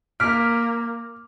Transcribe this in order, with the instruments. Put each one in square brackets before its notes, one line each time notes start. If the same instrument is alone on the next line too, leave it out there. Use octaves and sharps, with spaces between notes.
[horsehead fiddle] A#3 [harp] D6 B6 [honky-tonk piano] F6